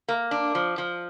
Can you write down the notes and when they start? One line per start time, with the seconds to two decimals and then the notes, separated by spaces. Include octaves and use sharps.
0.08 A#3
0.31 D4
0.55 F3
0.78 F3